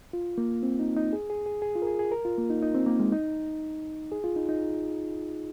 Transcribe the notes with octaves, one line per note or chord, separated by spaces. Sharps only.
F4
A#3
C4
D#4
D#4
G#4
G#4
G#4
G#4
F4
A#4
G#4
G#4
A#4
F4
A#3
D#4
D#4
C4
A#3
G#3
D#4
G#4
F4
D#4
D#4